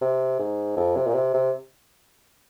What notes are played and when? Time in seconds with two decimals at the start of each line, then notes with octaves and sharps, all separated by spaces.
0.01 C3
0.39 G#2
0.77 F2
0.96 C3
1.07 A#2
1.14 C3
1.34 C3